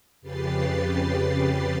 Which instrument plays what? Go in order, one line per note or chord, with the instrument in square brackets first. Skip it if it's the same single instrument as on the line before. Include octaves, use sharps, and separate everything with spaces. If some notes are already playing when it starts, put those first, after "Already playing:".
[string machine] F2 C#3 G4 B4 A6 C7